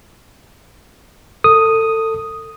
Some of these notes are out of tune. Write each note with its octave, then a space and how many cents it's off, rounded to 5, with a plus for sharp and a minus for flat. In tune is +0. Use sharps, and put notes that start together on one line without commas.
A4 +25 D#6 +0